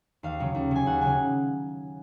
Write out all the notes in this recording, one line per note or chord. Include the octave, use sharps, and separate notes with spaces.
D#2 F5
C#3 F#3
D#2
C#3 F#3 G#5
D#2 F#5
C#3 F#3 G#5